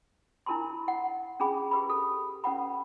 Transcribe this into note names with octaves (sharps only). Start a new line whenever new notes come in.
D4 E4 A#4 A5 B5 C6
F#5
C#4 D4 G#4 B5
G4 B4 B5
A4
C#4 B4 F#5 B5